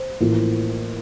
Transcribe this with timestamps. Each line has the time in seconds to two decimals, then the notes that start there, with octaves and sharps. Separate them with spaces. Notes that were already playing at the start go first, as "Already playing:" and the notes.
Already playing: C5
0.20 A1 A2 F3 A#3